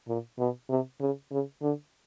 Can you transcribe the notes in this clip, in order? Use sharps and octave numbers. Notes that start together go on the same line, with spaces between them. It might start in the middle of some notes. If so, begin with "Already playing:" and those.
A#2
B2
C3
C#3
C#3
D3